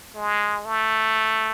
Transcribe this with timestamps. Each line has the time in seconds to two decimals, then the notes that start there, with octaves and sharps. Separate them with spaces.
0.15 G#3
0.65 A3